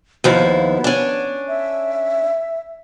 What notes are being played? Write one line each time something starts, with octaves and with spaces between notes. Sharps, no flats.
D#2 F3 B3 E4
C#4 D4
E5